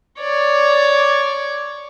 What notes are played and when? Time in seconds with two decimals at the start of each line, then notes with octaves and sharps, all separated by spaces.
0.20 C#5 D5